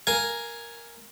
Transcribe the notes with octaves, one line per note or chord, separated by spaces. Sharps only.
A#4 F5 G#5